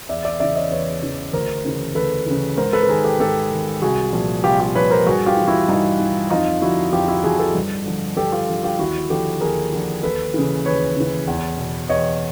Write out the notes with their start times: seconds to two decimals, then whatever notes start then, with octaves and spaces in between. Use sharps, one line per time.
0.09 E2 D5 E5
0.25 D5 E5
0.40 C#3 E3 D5 E5
0.56 C#5 D#5
0.71 E2 B4 C#5
1.03 C#3 E3
1.33 D2 A#4 C5
1.65 C#3 E3
1.95 D2 A4 B4
2.26 C#3 E3
2.57 G#2 A#4 C5
2.73 A4 B4
2.83 A4
2.88 D#3 G#4 A#4
3.04 G4 A4
3.20 G#2 G4 A4
3.51 D#3
3.82 C2 F#4 G#4
4.13 A#2 F3
4.44 C2 F4 G4
4.60 F4 G4
4.75 A#2 F3 B4 C#5
4.91 A#4 C5
5.06 G2 F#4 G#4
5.26 F4 G4
5.37 E3
5.47 E4 F#4
5.69 G2 D#4 F4
6.00 E3
6.30 F2 D#4 F4
6.62 D3 F3 E4 F#4
6.93 F2 F4 G4
7.08 E4 F#4
7.24 D3 F3 F#4 G#4
7.39 G4 A4
7.55 G2
7.86 D3 F3
8.17 G2 G4 A4
8.32 F4 G4
8.49 D3 F3
8.63 F4 G4
8.79 D#2 E4 F#4
9.10 D3 F3 G4 A4
9.41 D#2 G#4 A#4
9.72 D3 F3
10.03 D#2 A4 B4
10.34 C#3 E3
10.65 D#2 B4 C#5
10.97 C#3 E3
11.27 E2
11.58 B2
11.89 E2 C#5 D#5